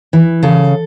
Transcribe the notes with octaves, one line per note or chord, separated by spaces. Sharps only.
E3
C#3 A4